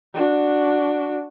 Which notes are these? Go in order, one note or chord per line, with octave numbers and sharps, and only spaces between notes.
D4 F#4